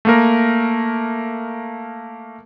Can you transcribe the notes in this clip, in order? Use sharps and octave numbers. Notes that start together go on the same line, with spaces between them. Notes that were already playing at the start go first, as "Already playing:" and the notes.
A3 A#3 A#4